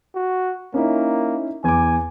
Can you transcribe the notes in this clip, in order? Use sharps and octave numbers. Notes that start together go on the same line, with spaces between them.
F#4
A#3 C#4 D#4 E4
E2 G#5 D6